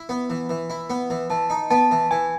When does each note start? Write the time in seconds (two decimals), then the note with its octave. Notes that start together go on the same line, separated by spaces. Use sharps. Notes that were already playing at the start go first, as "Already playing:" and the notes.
Already playing: E4
0.09 B3
0.30 E3
0.49 E3
0.70 E4
0.90 B3
1.10 E3
1.30 E3 A5
1.50 D#4
1.71 B3 A5
1.91 E3
2.11 E3 G#5